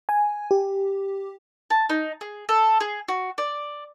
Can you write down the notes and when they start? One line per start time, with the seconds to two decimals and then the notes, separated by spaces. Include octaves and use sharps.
0.09 G#5
0.51 G4
1.70 A5
1.89 D#4
2.21 G#4
2.49 A4
2.80 G#4
3.08 F#4
3.38 D5